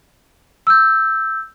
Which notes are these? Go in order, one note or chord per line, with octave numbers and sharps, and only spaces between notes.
E6 G6